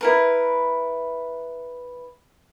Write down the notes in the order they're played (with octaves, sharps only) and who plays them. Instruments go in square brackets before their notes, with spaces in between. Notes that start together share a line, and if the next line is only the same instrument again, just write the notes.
[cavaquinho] E4 A#4 B4